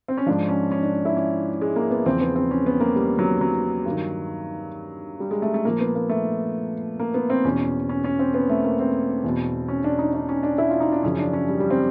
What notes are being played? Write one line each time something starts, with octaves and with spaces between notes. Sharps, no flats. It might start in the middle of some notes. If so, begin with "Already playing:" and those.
C4
C#4
G#2 F3 D4
C#4
C#4
D4
E4
C#4
G#3
A#3
B3
E2 C#3 F3 C4
B3
C4
C#4
B3
A#3
G3
F#3
F#3
G2 D#3
G3
G#3
A3
A3
A#2 F3 A#3
B3
A#3
A3
A#3
B3
C4
E2 B2 C#4
C#4
C#4
C4
B3
A3
A#3
C4
E2 B2
C#4
D4
D#4
D4
C#4
D4
E4
F4
D#4
D4
F#2 C#3 F3 C#4
D4
C#4
G3
G3
C4